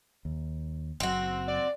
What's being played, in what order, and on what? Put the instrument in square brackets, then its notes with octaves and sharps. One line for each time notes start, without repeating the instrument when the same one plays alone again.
[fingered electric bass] D#2
[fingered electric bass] F#1 F#3 [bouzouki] C4 F#4
[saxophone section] D5